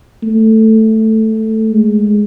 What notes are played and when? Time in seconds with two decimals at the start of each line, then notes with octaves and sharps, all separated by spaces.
0.23 A3
1.72 G#3